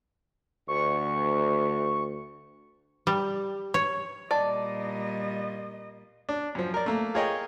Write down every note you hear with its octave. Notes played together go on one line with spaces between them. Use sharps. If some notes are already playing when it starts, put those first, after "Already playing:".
D2 C#6
G3
C#5
A#2 G3 D5 D#5 A5
D4
F#2 F3
A#4 D5
A3 A#3
F4 G#4 A#4 C#5 D#5 G5